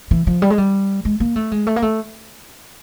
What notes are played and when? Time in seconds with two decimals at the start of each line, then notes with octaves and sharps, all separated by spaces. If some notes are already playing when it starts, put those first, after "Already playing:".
0.11 E3
0.27 F3
0.42 G3
0.50 G#3
0.58 G3
1.05 G#3
1.20 A#3
1.36 A3
1.52 G#3
1.67 A3
1.76 A#3
1.82 A3